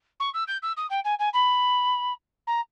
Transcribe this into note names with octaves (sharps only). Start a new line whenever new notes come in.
C#6
E6
G6
E6
D#6
G5
G#5
G#5
B5
A#5